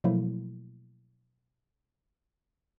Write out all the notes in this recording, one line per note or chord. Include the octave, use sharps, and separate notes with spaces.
B2 F3 F#3 A3 A#3 E4